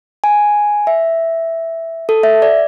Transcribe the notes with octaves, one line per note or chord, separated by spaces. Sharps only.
G#5
E5
A4
E5
D5